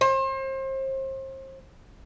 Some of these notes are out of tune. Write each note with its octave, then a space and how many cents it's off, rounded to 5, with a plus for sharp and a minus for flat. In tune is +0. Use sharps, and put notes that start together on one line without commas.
C5 +35